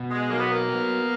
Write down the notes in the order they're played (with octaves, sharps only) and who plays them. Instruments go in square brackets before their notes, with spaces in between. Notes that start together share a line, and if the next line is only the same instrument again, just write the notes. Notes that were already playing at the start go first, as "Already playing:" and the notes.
Already playing: [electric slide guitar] B2
[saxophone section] G#3
[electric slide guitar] F#3 [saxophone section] A#3
[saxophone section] B3
A#3
[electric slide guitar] B3